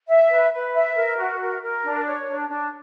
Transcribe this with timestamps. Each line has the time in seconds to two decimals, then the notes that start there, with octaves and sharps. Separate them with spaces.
0.09 E5
0.30 B4
0.53 B4
0.75 E5
0.96 A#4
1.18 F#4
1.41 A#4
1.63 A#4
1.85 D4
2.07 C#5
2.28 D4
2.50 D4